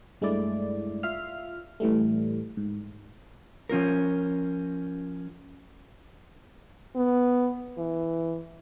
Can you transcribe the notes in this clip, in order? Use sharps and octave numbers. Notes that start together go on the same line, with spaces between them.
G2 G#3 A3 E4 D5
F4 E5 F5 F6
A2 E3 G3 A3
G#2
F3 C#4 F4 A#4
B3
E3